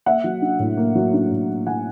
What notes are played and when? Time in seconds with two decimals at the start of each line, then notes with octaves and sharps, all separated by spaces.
0.06 A#3 E5 F#5
0.24 F#3
0.42 D4
0.59 A2
0.77 A#3
0.95 F#3
1.13 D4
1.31 A2
1.50 A#3
1.66 F#3 F#5 G#5